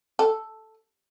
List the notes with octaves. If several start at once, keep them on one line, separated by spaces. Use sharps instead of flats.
A4